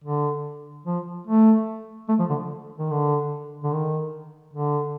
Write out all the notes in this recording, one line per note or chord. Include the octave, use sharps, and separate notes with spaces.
D3
F3
A3
A3
F3
D3
D#3
D3
D3
D#3
D3